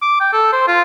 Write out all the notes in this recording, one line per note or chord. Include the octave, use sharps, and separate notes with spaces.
D6
G5
A4
C5
F4